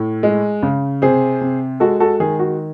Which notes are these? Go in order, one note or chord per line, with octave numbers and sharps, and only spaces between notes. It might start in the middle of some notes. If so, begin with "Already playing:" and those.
Already playing: A2
G#3
C#3
C3 G#4 C5
C3
G#3 F#4 A4
F#4 A4
D#3 G#4
F#4